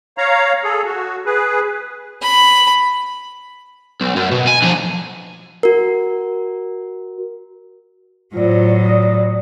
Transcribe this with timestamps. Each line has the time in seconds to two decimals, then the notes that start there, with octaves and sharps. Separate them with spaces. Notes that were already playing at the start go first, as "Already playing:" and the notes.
0.18 C#5 F5 A#5
0.64 G#4 A4
0.84 F#4
1.26 G#4 B4
2.22 B5
4.01 B1
4.16 F#2
4.31 B2
4.47 G#5
4.62 D3 F3
5.63 F#4 A#4
8.34 A2 F#3 F4 C5 D5
8.85 D5 D#6